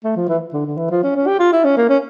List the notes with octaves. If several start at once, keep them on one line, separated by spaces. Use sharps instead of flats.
A3
F3
E3
D3
D3
E3
F3
C#4
C#4
G4
F4
E4
C#4
A#3
C#4